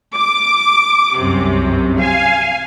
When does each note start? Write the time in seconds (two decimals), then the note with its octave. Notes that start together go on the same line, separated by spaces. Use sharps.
0.15 D6
1.18 C2 F#2 C3
2.00 F5 G#5